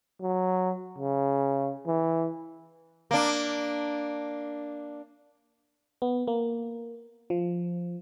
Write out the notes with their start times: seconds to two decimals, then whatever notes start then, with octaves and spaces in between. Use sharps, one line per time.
0.21 F#3
0.98 C#3
1.87 E3
3.11 A#3 D4
6.02 B3
6.28 A#3
7.30 F3